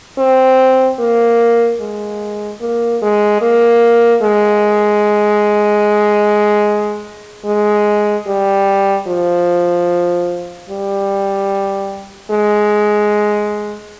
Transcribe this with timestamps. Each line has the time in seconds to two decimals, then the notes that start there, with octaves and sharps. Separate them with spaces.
0.18 C4
0.99 A#3
1.81 G#3
2.61 A#3
3.02 G#3
3.41 A#3
4.23 G#3
7.46 G#3
8.27 G3
9.08 F3
10.70 G3
12.31 G#3